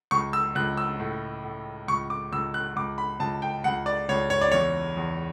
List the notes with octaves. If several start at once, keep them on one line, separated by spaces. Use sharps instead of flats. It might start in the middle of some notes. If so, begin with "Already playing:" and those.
C#2 C#6
E6
C#2 F#6
E6
A2
A2
C#2 C#6
D6
C#2 E6
F#6
C#2 D6
B5
C#2 A5
G5
C#2 F#5
D5
C#2 C#5
C#5
D5
E2 C#5
E2